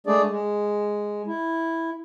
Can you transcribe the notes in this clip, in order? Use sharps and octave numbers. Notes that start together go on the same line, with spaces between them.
G#3 A3 D4 G#4 D5
G#3
E4